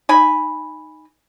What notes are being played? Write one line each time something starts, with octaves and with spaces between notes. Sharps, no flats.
D#4 G#5 B5